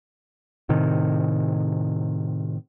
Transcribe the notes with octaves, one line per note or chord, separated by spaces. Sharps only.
A2 C3 D#3